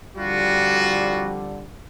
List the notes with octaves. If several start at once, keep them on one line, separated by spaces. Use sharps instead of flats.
F2 D3 G3 F4 F#4